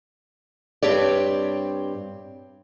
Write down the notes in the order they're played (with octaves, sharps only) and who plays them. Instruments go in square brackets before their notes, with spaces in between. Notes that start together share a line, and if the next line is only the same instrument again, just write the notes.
[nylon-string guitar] G2 C4 G4 C#5 D5